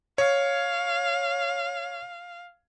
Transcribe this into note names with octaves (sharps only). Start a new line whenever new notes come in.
C#5 F5